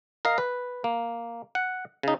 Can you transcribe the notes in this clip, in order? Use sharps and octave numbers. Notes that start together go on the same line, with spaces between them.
A#4 D#5 F5 A#5
B4
A#3
F#5
C#3 D#4